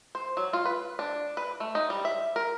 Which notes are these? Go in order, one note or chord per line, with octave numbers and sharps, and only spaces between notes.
C5
F#3
F4
B4
D4
B4
A3
D#4
G3
E5
A#4